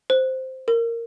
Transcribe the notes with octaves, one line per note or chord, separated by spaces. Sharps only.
C5
A#4